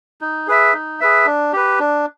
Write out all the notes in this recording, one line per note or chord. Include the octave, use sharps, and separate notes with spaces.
D#4
G#4 B4 E5
D#4
G#4 B4 E5
D4
G4 B4
D4